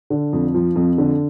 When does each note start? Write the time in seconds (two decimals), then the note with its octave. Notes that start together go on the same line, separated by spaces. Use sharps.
0.10 D3
0.33 F2
0.54 F3
0.76 F2
0.98 D3